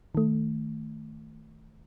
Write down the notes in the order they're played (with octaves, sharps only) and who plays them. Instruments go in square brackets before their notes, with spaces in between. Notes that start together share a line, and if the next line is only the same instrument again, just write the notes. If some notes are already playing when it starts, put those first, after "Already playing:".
[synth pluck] D#3 A3